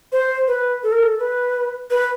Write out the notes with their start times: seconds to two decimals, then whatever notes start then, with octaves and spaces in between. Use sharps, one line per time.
0.12 C5
0.48 B4
0.83 A4
0.92 A#4
1.03 A4
1.20 B4
1.91 B4